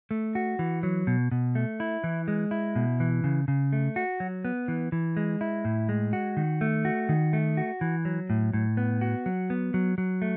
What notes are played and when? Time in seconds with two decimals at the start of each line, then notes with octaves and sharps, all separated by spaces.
0.11 A3
0.35 F#4
0.59 E3
0.83 F#3
1.07 B2
1.31 B2
1.55 A3
1.80 E4
2.04 E3
2.28 G#3
2.51 E4
2.76 B2
3.00 E3
3.24 C#3
3.48 C#3
3.73 A3
3.96 F#4
4.20 F#3
4.45 B3
4.68 E3
4.92 E3
5.17 G#3
5.41 E4
5.65 A2
5.89 G#3
6.13 F#4
6.37 D#3
6.61 A3
6.85 F#4
7.09 D#3
7.33 A3
7.57 F#4
7.81 E3
8.05 F#3
8.30 A2
8.53 A2
8.77 B3
9.01 F#4
9.26 F#3
9.50 B3
9.74 F#3
9.98 F#3
10.22 A3